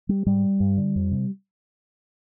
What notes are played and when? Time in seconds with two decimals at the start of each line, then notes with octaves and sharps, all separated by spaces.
0.09 G3
0.26 G#2 G3
0.60 G2
0.77 D3
0.96 F2
1.12 C3